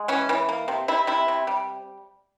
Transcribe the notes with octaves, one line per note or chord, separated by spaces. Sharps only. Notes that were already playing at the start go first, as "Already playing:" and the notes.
Already playing: G#3
E3 C#4
E3
A#3
C3
C3 E4
C3 E4
C3
G3